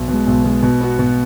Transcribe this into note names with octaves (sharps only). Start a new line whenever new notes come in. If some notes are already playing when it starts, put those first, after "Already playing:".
Already playing: B1
B2 G#3
B1
B2 G#3
B2
B3 F#4
B2